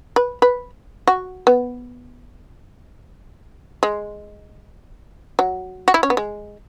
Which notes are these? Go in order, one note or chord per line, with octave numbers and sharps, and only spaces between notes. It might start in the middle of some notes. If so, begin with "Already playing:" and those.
B4
B4
F#4
B3
G#3
F#3
F#4
E4
C#4
B3
G#3